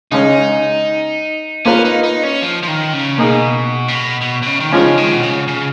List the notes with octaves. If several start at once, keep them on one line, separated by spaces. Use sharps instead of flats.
C#3 G#3 C#4 D#4 G#4
A#3 C#4 F4 B4
D#4
D#4
C#4
F3
F3
D#3
C#3
B2 A#3 D#4 G#4
C#3
B2
B2
B2
C#3
D#3
C#3 F3 G#3 C#4 F4
D#3
B2
C#3
C#3